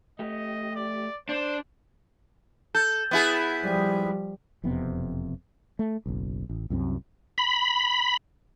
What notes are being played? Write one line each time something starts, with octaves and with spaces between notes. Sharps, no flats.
A3 G4 D#5
D5
D4 C5
A4 G6
B3 E4 G#4
F3 G3
E1 F2 C3 B3
A3
F#1 B1
A1
C2 F#2 C4
B5